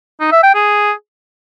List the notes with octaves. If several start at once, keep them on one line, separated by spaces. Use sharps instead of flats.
D#4
E5
G5
G#4